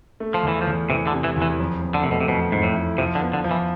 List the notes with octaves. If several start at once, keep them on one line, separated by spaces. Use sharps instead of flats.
A3
F3
E2 E3
F3
E2
C3 E3
D3
C3
E3
E2
E3
F2
F2
D3
C3 A3
B2
C3
F2 B2
F2 G#2
A2
E4
C3 F3
D3
B3
D3
F3
E3